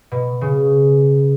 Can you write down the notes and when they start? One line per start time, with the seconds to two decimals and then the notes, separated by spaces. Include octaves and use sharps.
0.12 B2
0.41 C#3